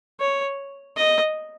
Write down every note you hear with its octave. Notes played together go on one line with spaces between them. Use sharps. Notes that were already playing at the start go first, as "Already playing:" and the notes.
C#5
D#5